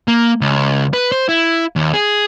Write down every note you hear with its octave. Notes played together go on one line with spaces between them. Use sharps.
A#3
C#2
B4
C5
E4
D#2
G#4